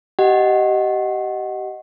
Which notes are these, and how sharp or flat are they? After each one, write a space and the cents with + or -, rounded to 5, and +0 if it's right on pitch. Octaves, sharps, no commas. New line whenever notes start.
G4 -25 D#5 +0 F#5 +0